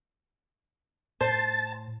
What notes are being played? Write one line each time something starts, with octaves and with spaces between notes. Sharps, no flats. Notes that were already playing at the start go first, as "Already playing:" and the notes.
A2 C5 A5